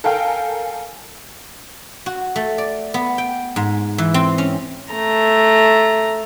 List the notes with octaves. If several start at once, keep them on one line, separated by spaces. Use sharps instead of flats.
A4 A#4 F5 G5 G#5
F#4
A3
D5
B3
G5
G#2
E3
C4
C#4
A3 A#5